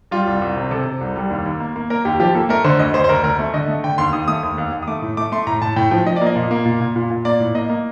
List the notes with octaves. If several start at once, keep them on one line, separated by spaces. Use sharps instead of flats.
G3 F4
C2
C2
C3
C3 A4
C3
C2
G3
D#2
D#2
A#3
A#3
A#3 A#4
D#2 G4
F3 G4
A#3 A4
A3 A#4
D3 C5
D2 D#5
D2 C5
C5
D2 A#4
D2 A#4
A3
D3 D#5
A3
D3 G5
D#2 C6
D#2 D#6
A3 D#6
D#2
D#2
D#2
D#6
A3 D6
A2
A3 D6
A3 C6
A2 A#5
A2 A5
A2 G5
F3 G5
F3 D#5
D5
A#3 D#5
A#2
A#3
A#2
A#2
A#2
A#2
A#3 D5
A2
A#3 D#5
A#3